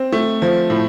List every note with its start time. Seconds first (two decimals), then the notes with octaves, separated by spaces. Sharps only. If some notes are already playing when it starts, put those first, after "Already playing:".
Already playing: C4
0.12 A3
0.42 F3
0.70 A2